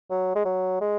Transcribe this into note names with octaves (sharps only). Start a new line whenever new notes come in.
F#3
G#3
F#3
G#3